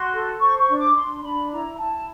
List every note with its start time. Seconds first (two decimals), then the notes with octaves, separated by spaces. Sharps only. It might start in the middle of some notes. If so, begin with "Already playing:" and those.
Already playing: F#4 C6
0.12 A4
0.40 C5 C#6
0.59 C#6
0.68 D4
0.78 D6
0.95 D4 C6
1.23 D4 B5
1.52 E4 A#5
1.79 E4 A5